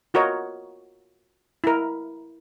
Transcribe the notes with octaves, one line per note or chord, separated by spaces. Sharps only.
F4 F#4 A#4 C#5 D#5
E4 A#4